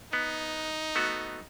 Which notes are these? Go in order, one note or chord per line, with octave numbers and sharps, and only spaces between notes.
B3 D#4
A3 B3 F#4